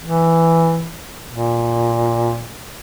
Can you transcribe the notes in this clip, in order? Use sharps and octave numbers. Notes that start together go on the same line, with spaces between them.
E3
A#2